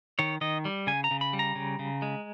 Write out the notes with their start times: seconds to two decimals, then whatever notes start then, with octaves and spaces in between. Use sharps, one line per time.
0.19 D#3 C#5
0.41 D#3 D#5
0.65 G3
0.87 C#3 G#5
1.04 A#5
1.11 C#3
1.21 B5
1.33 G3
1.39 A#5
1.56 C#3
1.79 C#3
2.02 G#3